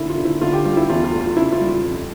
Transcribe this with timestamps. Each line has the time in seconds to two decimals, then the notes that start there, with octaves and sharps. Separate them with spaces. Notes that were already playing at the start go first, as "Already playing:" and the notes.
Already playing: D3 A#3 E4
0.10 F4
0.18 D3
0.25 E4
0.41 D3 F4
0.53 G4
0.65 G3 F4
0.77 E4
0.90 E2 F4
1.04 F4
1.13 A3
1.21 F4
1.37 C#3 E4
1.52 F4
1.61 G3
1.69 F4
1.85 F2